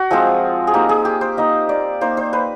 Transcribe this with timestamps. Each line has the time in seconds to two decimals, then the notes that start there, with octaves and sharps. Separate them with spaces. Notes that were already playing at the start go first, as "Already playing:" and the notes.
Already playing: F#4
0.11 F3 G#3 C4 F4
0.67 G#4
0.74 A#3 D#4 G4
0.89 G#4
1.05 G4
1.21 C5
1.37 A#3 D#4 D#5
1.69 D5
2.01 A#3 D#4 C5
2.17 C5
2.33 B4